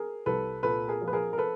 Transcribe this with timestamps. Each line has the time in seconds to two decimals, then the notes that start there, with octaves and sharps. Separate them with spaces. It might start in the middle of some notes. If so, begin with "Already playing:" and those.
Already playing: G#4 A#4
0.26 C2 A4 B4
0.63 A#2 A4 B4
0.88 G#4 A#4
1.02 F3
1.07 B4
1.13 G#4 A#4
1.33 A#4
1.38 A4 B4